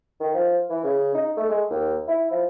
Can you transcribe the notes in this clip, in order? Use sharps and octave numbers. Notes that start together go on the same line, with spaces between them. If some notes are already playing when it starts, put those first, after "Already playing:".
D#3
F3
E3
C#3
D#4
A3
G#3
D#2
E4
F3